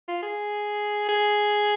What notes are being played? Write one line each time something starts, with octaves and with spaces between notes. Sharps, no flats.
F4
G#4
G#4